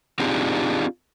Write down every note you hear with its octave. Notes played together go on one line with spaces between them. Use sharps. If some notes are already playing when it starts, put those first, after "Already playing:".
C4 D4 D#4 F4 G4 G#4